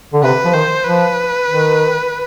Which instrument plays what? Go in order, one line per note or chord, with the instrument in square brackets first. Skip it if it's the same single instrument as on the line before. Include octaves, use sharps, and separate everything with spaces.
[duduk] D3
[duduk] C3 [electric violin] B4
[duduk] F3
[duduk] D#3 [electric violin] C5
[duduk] F3 [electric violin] B4
[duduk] D#3